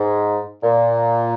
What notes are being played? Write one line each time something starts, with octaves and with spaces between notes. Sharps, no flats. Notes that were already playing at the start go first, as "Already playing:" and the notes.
Already playing: G#2
A#2